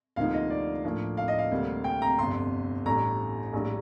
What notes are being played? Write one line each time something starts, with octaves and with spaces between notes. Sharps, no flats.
D2 C3 F3 A#3 D#4 F5
D#5
D5
A2 F3 A#3 D4
F5
D#5
F5
D2 C3 G3 A#3
G5
A#5
G1 F2 C3 C6
A1 A2 G3 D4 A#5
A#1 A2 G3 D4